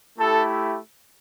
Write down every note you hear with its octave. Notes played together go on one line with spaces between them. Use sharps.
A3 E4 G4 A4